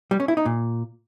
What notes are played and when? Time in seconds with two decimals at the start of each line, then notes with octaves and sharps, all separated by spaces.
0.11 G3
0.20 C#4
0.28 E4
0.37 D#4
0.46 A#2